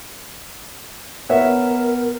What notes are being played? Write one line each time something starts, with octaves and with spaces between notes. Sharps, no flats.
B3 A#4 C#5 E5